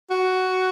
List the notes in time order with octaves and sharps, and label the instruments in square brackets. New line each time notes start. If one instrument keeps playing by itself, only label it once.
[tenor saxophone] F#4